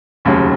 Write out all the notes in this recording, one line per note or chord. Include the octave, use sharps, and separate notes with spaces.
F1 D#2 C#3 F#3